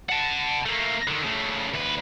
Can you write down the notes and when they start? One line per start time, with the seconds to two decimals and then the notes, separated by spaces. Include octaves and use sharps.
0.10 F#5 A5
0.66 A3 A#3
1.08 D3 D#3
1.24 C#3 A3
1.74 D2 B4